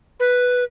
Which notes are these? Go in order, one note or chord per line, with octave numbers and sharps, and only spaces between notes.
B4